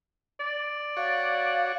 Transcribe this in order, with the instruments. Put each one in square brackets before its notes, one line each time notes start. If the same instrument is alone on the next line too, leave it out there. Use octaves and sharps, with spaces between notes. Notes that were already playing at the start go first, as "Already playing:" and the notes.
[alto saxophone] D5
[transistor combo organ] F#4 C#5 [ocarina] F5